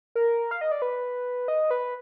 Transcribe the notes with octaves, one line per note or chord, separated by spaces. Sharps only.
A#4
F5
D#5
D5
B4
D#5
B4